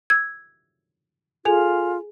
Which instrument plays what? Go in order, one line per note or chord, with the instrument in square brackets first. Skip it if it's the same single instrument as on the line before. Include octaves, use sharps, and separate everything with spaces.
[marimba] E6 [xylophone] G#6
[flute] F4 [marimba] G#4 [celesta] A4 G#5 F7